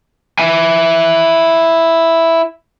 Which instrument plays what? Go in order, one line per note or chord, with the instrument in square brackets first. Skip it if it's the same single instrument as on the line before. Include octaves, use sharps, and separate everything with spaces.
[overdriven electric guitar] E4 G#5